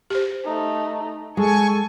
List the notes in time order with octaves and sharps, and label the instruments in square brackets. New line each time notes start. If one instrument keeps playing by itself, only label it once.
[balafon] G4 C5
[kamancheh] A3 D#4
[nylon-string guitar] G#3 [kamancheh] A4 [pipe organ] G#5 C#6